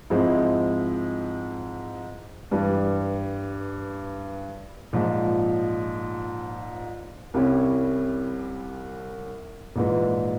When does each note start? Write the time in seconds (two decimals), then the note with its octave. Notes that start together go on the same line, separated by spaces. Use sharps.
0.10 G#2 F3 G#3 C4 E4
2.51 G2 E3 G3
4.93 A#1 G#2 F3
7.34 C2 C3 G3 C#4 E4
9.76 A#1 G#2 E3